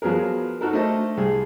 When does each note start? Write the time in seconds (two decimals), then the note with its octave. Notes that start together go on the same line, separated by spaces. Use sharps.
0.02 F3 F#3 B3 G#4 A#4
0.61 D#4 F#4 A4 A#4
0.73 A3 D4 A4 C5 D#5
1.17 C2 G#4